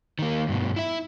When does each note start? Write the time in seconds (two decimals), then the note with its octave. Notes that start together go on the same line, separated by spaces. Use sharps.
0.19 D#3 A#3
0.48 G2 B2
0.76 E4 E5